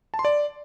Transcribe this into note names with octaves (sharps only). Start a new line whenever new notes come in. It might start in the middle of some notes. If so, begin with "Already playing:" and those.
A5
C6
D5